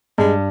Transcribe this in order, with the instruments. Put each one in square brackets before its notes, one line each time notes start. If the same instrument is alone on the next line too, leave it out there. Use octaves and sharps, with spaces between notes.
[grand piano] G2 [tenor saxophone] G#3